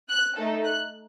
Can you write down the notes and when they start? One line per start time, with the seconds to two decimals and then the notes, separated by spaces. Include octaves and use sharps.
0.09 F#6
0.37 A3 D#4 A4
0.64 F#6